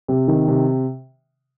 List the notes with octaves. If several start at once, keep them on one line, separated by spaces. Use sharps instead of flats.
C3
D#3
C3